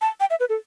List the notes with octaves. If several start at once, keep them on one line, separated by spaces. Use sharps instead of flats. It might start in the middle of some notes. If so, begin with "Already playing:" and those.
A5
G5
E5
B4
A4